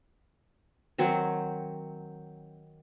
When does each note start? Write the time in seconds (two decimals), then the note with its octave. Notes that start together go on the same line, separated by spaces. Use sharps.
0.98 D#3 F#3 C4